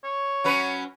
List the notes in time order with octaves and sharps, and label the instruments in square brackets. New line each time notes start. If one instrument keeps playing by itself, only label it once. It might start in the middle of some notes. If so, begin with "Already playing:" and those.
[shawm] C#5
[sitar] F#3 C#4 B4